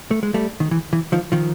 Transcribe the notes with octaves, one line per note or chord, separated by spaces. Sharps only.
A3
G#3
G3 A3
D#3
E3
E3
D#3 F3
D#3 F3